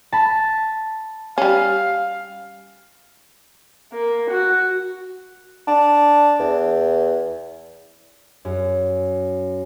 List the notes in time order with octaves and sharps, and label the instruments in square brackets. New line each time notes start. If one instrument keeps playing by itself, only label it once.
[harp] A5 B5
[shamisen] G3 C#4 [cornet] F5
[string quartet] A#3
F#4
[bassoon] D4
E2
[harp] F#2